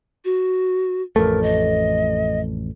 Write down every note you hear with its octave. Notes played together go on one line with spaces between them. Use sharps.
F#4
A1 F2 A3 A#4
D#5